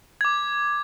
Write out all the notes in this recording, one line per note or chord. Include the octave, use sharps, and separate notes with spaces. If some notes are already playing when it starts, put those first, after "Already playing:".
D6 G#6